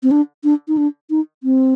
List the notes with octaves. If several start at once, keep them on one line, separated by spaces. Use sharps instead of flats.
C4
D4
D4
D#4
D4
D#4
C4